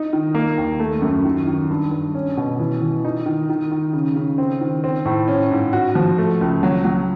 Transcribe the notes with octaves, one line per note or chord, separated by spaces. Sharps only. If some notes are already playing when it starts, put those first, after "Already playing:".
Already playing: D#4
D#3
A#3
D#2
A3
F#2
D#3
D#3
G2
G2
C#4
B2
E3
E3
D#4
D#3
D#3
D#3
C#3
C#3
C4
D#3
C4
A2
C#4
G#2
F#4
F3
A3
C#2
F#3
F#3